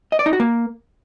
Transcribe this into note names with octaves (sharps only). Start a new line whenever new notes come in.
D#5
D5
D#4
F#4
A#3